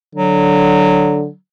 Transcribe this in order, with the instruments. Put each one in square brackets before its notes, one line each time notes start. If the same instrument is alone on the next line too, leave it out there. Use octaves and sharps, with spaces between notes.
[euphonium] D3 [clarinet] F#3